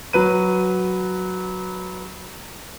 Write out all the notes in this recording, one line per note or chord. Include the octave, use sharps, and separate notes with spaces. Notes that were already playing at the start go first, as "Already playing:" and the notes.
F#3 B4 D#7